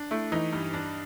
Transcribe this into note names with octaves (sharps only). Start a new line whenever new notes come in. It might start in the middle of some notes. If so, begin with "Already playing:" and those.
Already playing: D4
A3 E4
E3 D#4
G2
D4